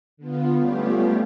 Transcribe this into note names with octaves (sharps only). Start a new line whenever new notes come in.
D3 B3 F4
G3 A3 B3 C#4 F4 G4